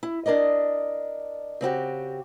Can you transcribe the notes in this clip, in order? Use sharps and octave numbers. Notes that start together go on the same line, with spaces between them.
E4
D4 A#4 D5 D#5
C#3 C4 F#4 G4